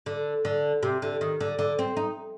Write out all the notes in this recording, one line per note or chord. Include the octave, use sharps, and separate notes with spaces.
D3
D3
C3
D3
D#3
D3
D3
C4
D#4